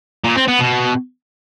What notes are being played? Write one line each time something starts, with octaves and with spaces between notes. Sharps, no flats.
A#2
C4
B3
B2